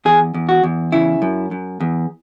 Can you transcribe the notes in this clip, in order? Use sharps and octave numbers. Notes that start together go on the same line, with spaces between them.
E2 G#4
E2
F#4
E2
C#3 E4
F#2
F#2
E2